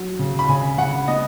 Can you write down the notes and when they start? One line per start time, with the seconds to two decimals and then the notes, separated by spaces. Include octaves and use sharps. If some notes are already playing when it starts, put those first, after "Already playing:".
Already playing: F#3
0.19 C#3
0.39 B5
0.49 C#3 G#5
0.78 C#3 F#5
1.08 B3 D#5